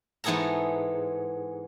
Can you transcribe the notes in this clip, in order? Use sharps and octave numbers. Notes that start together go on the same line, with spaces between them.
G#2 E3 B3 G#4 A4 A#5